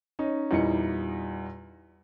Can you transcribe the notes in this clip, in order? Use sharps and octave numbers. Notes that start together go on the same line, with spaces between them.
C#4 D#4
E2 A#2 G3 D#4 E4 C#7